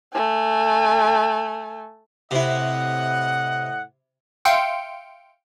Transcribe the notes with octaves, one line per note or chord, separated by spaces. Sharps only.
A3 G#5
A2 C3 E4 D#5 F#5
E5 F5 G5 C6 C#7 D7